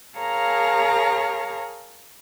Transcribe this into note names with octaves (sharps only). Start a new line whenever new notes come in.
G#4 A#4 C#5 F5 A5 A#5